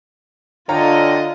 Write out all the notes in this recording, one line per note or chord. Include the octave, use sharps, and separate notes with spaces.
D3 F4 C#5 D#5 F5 G5 A#5